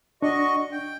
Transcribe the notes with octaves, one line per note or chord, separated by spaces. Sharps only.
D4 F#4 D#5 C#6
G5